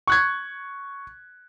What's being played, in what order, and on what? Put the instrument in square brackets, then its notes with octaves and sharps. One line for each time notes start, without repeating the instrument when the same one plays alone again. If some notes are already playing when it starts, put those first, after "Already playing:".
[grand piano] C#6 F#6 G#6